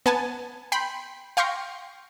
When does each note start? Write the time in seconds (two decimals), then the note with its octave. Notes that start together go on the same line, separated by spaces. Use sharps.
0.06 B3 G#5 A5
0.72 G5 B5 C6
1.37 F5 G5 C6 C#6 A#6